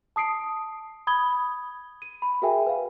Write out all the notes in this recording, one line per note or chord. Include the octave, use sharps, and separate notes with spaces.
A5 D#6 C7 D7
B5 D#6 G#6 G7
D#7
B5
F#4 G#4 A#4 E5 G5 G#5
B4 F5